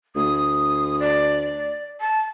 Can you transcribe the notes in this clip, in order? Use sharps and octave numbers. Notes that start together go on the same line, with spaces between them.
D2 D#6
D5
A5